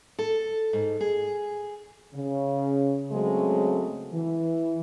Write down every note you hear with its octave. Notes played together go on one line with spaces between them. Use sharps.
A4
G#2
G#4
C#3
C#3 F#3 G#3 A3 C4
E3